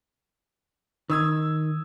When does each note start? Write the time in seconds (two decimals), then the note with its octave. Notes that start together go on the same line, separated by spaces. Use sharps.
1.10 D#3 D#6 E6 G#6